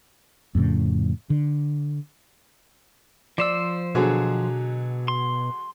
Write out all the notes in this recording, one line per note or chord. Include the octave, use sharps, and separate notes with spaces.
F2 A2 C#3
D3
F3 C5 D5 E6
B2 D3 F#3 G#4
C6